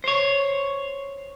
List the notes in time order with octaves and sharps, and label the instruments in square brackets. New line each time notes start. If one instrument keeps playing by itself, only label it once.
[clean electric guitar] C5 C#5